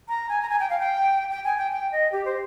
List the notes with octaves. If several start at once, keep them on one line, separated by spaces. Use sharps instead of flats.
A#5
G#5
A#5
G#5
G5
F5
G5
G5
G#5
G5
G5
D#5
G4
C5